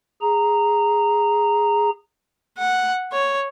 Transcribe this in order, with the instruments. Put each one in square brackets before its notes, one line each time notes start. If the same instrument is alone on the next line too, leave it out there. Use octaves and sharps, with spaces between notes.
[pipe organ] G#4 A#5
[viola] F#5
C#5